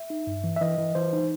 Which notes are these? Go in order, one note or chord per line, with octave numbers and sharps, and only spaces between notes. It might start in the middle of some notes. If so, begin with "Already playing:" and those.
Already playing: E5
D#4
G2
E3
E5
E3 D#5
E3
E3 C5
D#4